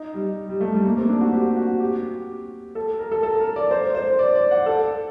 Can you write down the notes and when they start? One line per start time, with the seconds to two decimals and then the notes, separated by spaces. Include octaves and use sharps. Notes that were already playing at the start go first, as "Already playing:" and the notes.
Already playing: D#4
0.14 G3
0.49 G3
0.61 A3
0.72 G3
0.86 A#3
0.98 C4
1.09 D4
1.21 F#4
1.33 G4
1.56 F#4
1.80 G4
2.75 A4
2.99 A#4
3.12 A4
3.23 A4
3.40 A#4
3.56 D5
3.71 C5
3.95 C5
4.19 D5
4.35 D5
4.51 F#5
4.66 A4